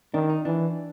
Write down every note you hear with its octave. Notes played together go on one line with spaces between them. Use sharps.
D#3 D4
D#4
E3 D4